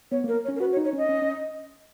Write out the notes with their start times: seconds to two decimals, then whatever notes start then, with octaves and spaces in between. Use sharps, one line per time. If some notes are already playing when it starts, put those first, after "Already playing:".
0.11 B3 C#5
0.24 A#3 A#4
0.44 C#5
0.48 C#4
0.56 A#4
0.60 F#4 B4
0.72 C#5
0.77 D#4
0.85 C#5
0.93 C#4 D#5
1.09 C#4
1.22 C#4